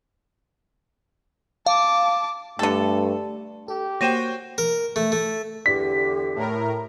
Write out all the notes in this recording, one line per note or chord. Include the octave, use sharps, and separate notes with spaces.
F5 A5 D6
G2 D3 A3 A4
G4 A4
A#3 F#4 C5 C#5 G5 A#6 D#7 E7
A#4
A3
A3
E2 D3 G4 B6
A2 A#4